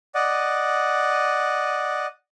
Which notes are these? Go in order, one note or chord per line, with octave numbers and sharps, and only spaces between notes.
D5 D#5 F#5